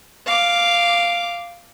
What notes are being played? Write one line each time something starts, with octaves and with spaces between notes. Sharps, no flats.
F5 D6